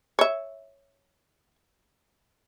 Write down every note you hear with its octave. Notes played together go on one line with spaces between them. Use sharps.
C#5 E5